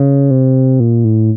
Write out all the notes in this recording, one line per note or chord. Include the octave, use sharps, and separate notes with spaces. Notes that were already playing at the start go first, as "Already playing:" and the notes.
Already playing: C#3
C3
A#2
A2